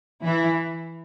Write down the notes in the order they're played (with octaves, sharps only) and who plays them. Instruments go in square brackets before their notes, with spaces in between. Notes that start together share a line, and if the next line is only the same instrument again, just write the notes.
[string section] E3 E4